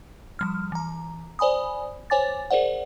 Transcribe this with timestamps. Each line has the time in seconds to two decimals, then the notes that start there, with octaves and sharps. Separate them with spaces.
0.39 F3 G3 F6
0.72 E3 A#5
1.39 C5 D5 G#5 B5 D#6
2.10 C5 C#5 G#5 D6 A6
2.51 G#4 A#4 C5 D5 F#5